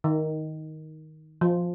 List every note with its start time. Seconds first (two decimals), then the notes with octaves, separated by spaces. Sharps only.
0.04 D#3
1.41 F3